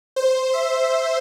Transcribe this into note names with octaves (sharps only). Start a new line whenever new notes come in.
C5
E5